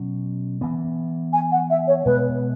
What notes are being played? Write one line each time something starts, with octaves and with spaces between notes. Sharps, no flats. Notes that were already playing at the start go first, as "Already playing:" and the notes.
Already playing: B2 F#3 C#4
E3 B3
G#5
F#5
E5
C#5
B2 G#3 B3 B4